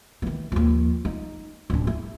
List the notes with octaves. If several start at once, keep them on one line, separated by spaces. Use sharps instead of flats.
D#3 E3
D#2 F3
D#4
D1 D4
E4